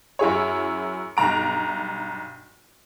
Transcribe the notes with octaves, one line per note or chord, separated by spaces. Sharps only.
F#2 E4 G#4 C#5
B1 G2 A#5 D7